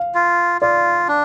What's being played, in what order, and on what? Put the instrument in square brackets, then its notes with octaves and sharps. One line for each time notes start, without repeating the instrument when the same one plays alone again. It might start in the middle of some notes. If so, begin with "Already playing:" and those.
Already playing: [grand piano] F5
[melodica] F4
[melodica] F4 [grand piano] D5
[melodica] D4